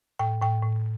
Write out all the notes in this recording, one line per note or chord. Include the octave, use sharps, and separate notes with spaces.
A2 G5
A2 G5
A2